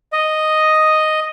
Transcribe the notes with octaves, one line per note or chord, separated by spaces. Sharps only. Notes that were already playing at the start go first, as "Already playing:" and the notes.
D#5